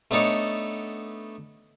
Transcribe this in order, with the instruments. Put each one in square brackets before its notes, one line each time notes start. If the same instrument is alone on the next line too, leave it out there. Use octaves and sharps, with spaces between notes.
[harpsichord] A3 B3 D4 D#4 A4 C#5